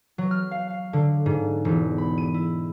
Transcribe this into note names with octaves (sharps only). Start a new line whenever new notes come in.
F#3
F6
F5
F5
D3
G#2
E1
B5
D#7
E4